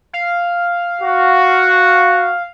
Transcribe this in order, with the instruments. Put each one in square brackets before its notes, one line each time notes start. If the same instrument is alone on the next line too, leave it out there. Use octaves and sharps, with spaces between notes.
[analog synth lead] F5
[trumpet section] F#4